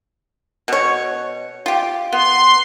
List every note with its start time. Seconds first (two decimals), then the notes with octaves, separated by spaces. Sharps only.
0.68 B2 C#5
1.66 F4 G4
2.13 B3 C6